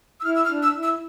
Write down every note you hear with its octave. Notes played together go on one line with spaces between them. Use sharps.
E6
E4 F6
E6
F6
D4
E6
E4
E6